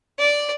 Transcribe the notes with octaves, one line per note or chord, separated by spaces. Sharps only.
D5